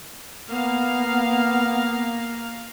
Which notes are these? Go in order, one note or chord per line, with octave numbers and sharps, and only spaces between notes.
A#3 B3 F5